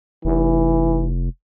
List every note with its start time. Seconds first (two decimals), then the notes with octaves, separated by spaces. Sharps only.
0.25 F1 E3